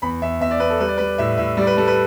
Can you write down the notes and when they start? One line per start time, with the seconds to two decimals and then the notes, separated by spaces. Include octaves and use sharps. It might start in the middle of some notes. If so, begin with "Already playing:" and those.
0.02 E2 B5
0.22 E2 E5
0.40 E2 E5
0.51 D5
0.60 E2 B4
0.70 A4
0.80 G3 B4
0.88 D5
0.98 G3 B4
1.18 A2 E5
1.38 A2 E5
1.57 G3 D5
1.67 B4
1.77 G3 A4
1.87 B4